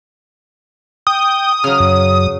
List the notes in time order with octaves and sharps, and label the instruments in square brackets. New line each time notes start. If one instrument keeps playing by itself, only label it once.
[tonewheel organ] G5 [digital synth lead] D#6
[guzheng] C#3 F#3 [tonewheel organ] F6
[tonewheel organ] F#2